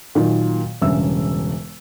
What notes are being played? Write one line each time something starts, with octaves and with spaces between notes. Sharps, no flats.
A#2 D#3 F#3 A#3
E1 G2 C#3 E5 E6